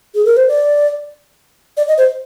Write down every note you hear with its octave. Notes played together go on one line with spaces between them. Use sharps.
G#4
A#4
C5
D5
D5
D#5
C5